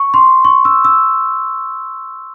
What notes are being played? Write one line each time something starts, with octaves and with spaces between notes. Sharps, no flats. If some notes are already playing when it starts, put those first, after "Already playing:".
Already playing: C#6
C6
C#6
E6
E6